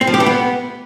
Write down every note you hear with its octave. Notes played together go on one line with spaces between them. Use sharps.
C4
F3
G4
E3
B3